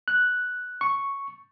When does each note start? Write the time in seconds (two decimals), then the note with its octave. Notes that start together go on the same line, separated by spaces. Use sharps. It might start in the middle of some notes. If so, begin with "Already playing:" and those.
0.08 F#6
0.81 C#6